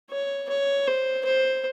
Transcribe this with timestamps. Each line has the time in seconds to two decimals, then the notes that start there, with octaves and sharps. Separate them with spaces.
0.11 C#5
0.49 C#5
0.87 C5
1.25 C5